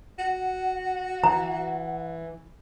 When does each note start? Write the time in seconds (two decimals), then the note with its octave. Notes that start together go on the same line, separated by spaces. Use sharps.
0.18 F#4 F#5
1.24 E3 A#5